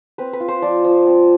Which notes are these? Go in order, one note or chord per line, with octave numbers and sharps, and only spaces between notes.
C4 B4
B4
F4
C5
F3 D5
F3
C4